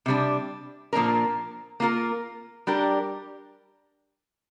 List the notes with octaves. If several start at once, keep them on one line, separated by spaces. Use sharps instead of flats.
C3 G3 D4
A#2 F3 A#3 D4 A#4
A#3 F4 A#4
G3 D4 G4 A#4